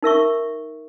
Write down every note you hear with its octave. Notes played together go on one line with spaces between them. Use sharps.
D#4 A#4 E5 C#6